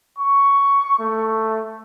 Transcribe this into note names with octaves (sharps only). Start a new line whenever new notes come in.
C#6
A3